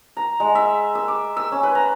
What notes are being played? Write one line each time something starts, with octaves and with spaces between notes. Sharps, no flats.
A#5
G#3
E5
E6
D6
E6
C#4
B4
A#5